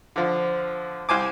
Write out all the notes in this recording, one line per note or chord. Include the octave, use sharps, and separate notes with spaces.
D3 F3
C2 C5 G#5 D6